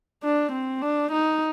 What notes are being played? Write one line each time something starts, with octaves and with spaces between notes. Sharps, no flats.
D4
C4
D4
D#4